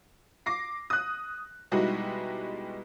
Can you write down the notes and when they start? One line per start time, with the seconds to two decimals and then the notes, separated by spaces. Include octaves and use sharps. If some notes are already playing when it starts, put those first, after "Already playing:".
0.46 D6 A#6 C7
0.90 D#6 F#6
1.71 B2 G3 G#3 D#4 E4 F#4